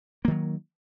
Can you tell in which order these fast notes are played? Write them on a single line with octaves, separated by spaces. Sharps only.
A#3 D#3 F#3